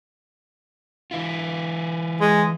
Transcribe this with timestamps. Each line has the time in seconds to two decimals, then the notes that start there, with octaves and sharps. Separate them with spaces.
1.11 E3 E4 F4
2.21 G#3